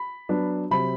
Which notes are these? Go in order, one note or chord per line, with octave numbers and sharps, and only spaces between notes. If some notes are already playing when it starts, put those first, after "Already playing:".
Already playing: B5
F#3 B3 D4
C3 F#3 C4 B5